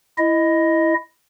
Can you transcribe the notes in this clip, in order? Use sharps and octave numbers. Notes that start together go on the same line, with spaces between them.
E4 D#5